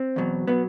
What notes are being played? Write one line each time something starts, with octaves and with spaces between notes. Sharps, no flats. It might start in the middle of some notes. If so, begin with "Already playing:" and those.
Already playing: C4
E2 B2 F#3
B2 F#3 B3